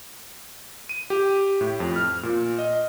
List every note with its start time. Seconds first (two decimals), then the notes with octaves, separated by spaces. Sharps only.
0.89 D#7
1.10 G4
1.61 A2
1.80 F2
1.96 F6
2.23 A#2
2.58 D#5